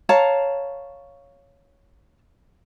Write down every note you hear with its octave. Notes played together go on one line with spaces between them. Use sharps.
C#5 F5 A5 A#5